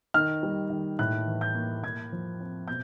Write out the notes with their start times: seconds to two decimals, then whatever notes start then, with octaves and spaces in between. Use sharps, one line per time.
0.14 D#3 F6
0.43 G3
0.70 D#3
0.99 A2 F#6
1.27 E3
1.41 G6
1.55 A#3
1.84 A2 G#6
2.12 F3
2.40 C4
2.68 B2 G6